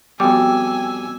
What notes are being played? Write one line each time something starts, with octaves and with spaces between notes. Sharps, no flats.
F2 G3 B3 F#4 G5 G#5 D6 E6